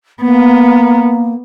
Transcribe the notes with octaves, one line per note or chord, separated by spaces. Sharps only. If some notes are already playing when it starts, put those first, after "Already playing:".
A#3 B3